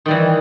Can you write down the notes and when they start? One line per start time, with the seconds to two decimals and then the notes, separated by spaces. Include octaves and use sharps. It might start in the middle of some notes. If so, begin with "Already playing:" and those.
0.06 D#3
0.08 G3
0.11 E3